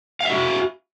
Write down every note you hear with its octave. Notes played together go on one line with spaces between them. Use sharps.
F#4 E5 F5